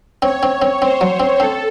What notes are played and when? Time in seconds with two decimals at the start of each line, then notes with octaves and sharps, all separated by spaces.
0.22 C4 C#5
0.43 C4
0.62 C4
0.82 C4 C5
1.01 F#3
1.20 C4
1.40 C4 A4